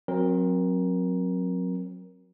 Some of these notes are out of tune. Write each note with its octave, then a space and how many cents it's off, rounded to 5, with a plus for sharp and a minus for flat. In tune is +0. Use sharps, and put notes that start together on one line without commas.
F#3 -20 C4 +30 A#4 +15